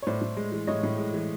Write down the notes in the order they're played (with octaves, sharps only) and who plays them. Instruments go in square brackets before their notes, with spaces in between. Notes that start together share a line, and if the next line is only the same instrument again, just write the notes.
[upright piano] C#5
A2 C5 D5
A2
G#3
E3
A2 C#5 D#5
A2
G#3
E3